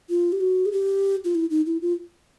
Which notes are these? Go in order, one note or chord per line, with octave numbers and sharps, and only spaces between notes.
F4
G4
F#4
G#4
G4
F4
E4
D#4
E4
F4